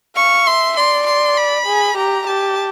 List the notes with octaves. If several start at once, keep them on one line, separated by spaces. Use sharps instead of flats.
F5 C#6
E5 C6
D5 C6
C6
B5
G#4
G4 A#5
G4 A5